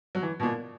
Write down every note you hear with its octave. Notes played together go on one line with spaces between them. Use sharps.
F#3
E3
B2
A#2